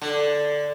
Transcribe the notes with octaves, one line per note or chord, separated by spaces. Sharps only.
D3